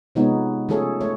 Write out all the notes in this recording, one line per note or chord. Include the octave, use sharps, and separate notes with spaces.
C3 F3 G#3 B3 D#4 C#5
C#3 F3 A3 G#4 A4 C#5
A3 C#5